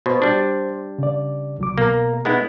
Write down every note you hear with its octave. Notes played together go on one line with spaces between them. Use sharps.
B2 C5 C6
G3 D4
C#3 D5
C2 F#3 D6
B2 A#3 A#5
G#3 B3 D#4 E4 F#6